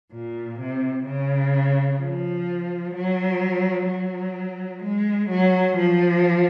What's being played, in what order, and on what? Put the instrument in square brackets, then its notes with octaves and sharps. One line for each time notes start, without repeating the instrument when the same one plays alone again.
[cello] A#2
C3
C#3
F3
F#3
F#3
G#3
F#3
F3